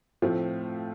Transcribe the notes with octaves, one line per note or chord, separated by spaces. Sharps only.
A2 F3 A3 C4